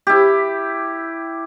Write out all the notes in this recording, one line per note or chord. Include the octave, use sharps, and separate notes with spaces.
E4 G4